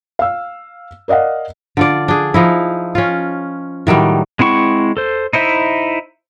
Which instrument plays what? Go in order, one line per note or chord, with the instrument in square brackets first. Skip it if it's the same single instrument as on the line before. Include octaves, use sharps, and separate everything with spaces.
[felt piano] F5 E6
A#4 D5 D#5 F5 F#5
[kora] D3 F4 D5
D4 G#4
F3 D#4 E4
C#4 F4
A2 D#3 F#3 G3
[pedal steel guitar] G#3 C4 E4 F#5 C#6
A4 C5
D#4 E4 C5 E5